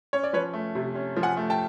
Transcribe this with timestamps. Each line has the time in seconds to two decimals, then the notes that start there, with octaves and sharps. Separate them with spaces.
0.13 C#4 C#5
0.23 D5
0.33 F3 B4 C#5
0.53 A3
0.75 C3
0.95 C#4
1.16 F3
1.23 F#5 G#5
1.37 A3
1.50 G5 A5